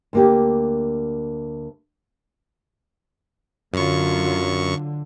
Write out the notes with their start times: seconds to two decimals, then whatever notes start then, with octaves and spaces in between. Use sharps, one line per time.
0.13 D2 A#3 G4
3.74 F#2 D3 F#3 F4 C#6